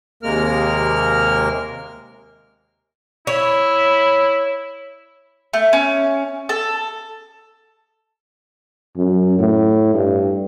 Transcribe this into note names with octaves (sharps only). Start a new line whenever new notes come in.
D#2 C3 G#3 A#3 A#4 F6
E4 C#5
A3
C#4
A4
F#2
A2
G2